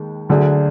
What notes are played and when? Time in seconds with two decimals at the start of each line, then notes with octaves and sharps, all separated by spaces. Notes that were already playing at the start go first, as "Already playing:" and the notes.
Already playing: D#2 D#3 G#3
0.29 D2 D3 F#3 D4 G#4